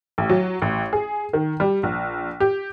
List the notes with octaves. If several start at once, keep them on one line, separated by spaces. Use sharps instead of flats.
A1
F#3
A1
G#4
D#3
G3
A#1
G4